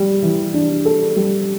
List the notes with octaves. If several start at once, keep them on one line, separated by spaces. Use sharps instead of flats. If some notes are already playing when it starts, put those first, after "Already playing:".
Already playing: G3
E3
D4
A4
G3